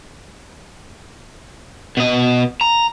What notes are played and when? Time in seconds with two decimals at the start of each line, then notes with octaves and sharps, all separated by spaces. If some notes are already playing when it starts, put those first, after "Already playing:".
1.97 B2 D#5
2.61 A#5